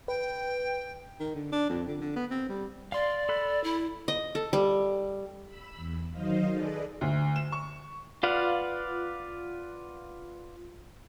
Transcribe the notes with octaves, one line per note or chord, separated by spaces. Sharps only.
B4 G5
D#3
D3
D4
F2
D3
D3
B3
C4
G3
D5 F5 C6
A4 B5 F#6
E4
D#5
A4
G3
B5 E6
E2
D#3 F#3 D#4 C5 D#5 F5
G#4 A4 B4 D5 D#5
D2
E7
C#6
F4 B4 D5 F5 F#5